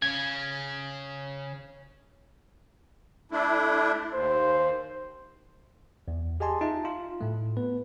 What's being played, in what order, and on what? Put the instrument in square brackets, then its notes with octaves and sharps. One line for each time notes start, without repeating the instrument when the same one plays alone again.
[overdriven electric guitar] C#3 C#4 [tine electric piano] G#6
[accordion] A3 D4 E4
[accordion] D#2 [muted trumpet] C5
[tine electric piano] E2
G4 G#4 D#5 G#5 A5 C6
D#4 F4 E5 A5
F4
A2 A3
B3 B4